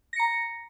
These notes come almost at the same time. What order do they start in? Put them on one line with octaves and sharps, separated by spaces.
A#6 C#7 A#5